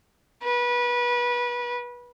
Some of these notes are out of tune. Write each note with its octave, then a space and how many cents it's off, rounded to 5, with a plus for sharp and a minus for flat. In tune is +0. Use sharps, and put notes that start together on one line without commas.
B4 -25